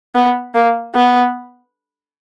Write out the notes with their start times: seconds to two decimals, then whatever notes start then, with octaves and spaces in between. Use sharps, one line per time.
0.15 B3
0.54 A#3
0.95 B3